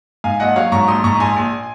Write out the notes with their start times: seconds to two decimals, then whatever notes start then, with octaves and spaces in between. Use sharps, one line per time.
0.24 G#2 F5 G#5
0.40 A#1 D#5 F#5
0.56 F#3 C#5 F5
0.72 G#2 A#5 C#6
0.88 A#1 C6 D#6
1.04 G#2 A#5 C#6
1.20 A#1 G#5 C6
1.36 A#1